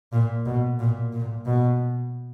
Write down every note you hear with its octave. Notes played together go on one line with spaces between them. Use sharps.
A#2
B2
A#2
A#2
B2